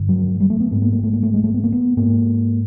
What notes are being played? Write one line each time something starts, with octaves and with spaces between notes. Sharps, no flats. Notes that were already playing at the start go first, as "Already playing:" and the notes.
Already playing: G2 D3
F#3
G3
A3
B3
G#2 B3
A#3
A#3
A3
A#3
A3
G#3
A3
B3
A#3
B3
G#2 A#3